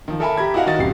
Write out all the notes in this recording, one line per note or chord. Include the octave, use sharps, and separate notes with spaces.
D#3 F3
A4 A#4 E5 G#5 A5 B5
G4 A#5 B5 G#6
E4 F#4 D#5 F5 F#5
D#3 F#4 D#5 A6
D1 F#2 G4 C7